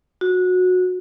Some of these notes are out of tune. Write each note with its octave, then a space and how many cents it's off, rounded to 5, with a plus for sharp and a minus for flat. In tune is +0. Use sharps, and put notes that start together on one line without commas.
F#4 -20